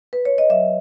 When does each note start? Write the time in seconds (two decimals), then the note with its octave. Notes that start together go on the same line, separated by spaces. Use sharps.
0.13 B4
0.25 C#5
0.38 D#5
0.49 F#3 E5